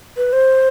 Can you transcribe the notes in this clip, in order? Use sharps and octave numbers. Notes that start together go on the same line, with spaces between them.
B4
C5